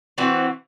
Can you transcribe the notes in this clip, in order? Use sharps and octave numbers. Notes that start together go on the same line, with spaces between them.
E3 C4 F#4